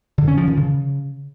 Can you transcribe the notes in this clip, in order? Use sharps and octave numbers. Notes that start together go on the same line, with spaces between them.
D3
C#4
F3
D#3
C#3